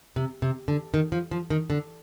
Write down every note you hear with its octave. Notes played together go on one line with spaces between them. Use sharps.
C3
C3
D3
D#3
F3
F3
D#3
D3